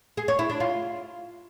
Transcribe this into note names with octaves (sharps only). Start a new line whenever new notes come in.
G#4
C#5
E4
D4
F4